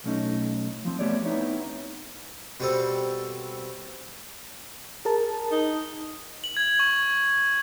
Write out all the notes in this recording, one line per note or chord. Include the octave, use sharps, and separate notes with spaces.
B1 A3 C#4 D#4
F3 C4
A3 B3 G4 C#5 D5
B3 C4 D#4 E4 C#5
B2 G3 C4 A4
G#4 A#4 A5
D#4
F#7
G#6
C#6